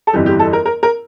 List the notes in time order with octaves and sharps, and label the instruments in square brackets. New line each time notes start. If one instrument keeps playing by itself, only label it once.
[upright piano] A4
G1 F2 E3 G3 G4
G4
A4
A#4
A#4
A#4